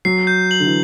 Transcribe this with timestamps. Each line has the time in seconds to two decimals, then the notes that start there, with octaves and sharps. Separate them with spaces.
0.05 F#3 C7
0.27 G6
0.51 F#7
0.60 D3
0.67 E3